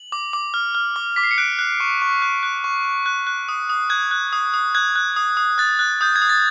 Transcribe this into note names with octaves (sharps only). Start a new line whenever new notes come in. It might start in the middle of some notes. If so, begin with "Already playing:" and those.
Already playing: F#7
D6
D6
F6
F6
D6
D6 B6
C7
C#7
F#6 D7
F#6
C#6
C#6
F#6
F#6
C#6
C#6
F#6
F#6
D#6
D#6
F#6 G#6
F#6
D#6
D#6
F#6 G#6
F#6
D#6
D#6
F#6 A6
F#6
D#6 G6
G#6
D#6
A6